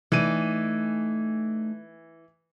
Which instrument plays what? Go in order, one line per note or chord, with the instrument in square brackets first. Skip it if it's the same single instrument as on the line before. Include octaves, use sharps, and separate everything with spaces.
[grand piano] E3 D#7 [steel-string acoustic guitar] A3 D#4 D5